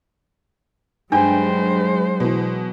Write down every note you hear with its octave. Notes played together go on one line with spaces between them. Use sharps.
G2 F#3 G#3 D4 C5 G5
B2 E3